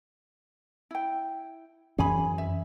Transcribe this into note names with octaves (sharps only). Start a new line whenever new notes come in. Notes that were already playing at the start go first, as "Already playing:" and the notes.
E4 G5
F#2 E3 C#4 G#4 G#5 B5
E5